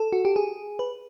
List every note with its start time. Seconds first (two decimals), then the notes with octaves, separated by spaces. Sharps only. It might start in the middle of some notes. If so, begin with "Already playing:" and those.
Already playing: A4
0.13 F#4
0.25 G4
0.36 G#4
0.79 B4